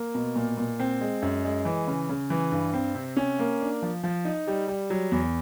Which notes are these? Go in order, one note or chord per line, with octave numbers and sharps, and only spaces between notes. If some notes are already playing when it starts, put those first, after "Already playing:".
Already playing: A#3
B2
A#2
A#2
C4
G#3
F#2
G#3
E3
C#3
C#3
E3
G2
C4
C3
C#4
A#3
D4
F3
F3
D#4
G3
G3
F#3
E2